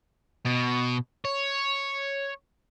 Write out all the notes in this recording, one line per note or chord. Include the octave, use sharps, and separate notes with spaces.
B2
C#5